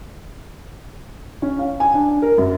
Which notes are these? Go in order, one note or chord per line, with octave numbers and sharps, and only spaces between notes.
C#4
F5
G#5
D4
A#4
F#2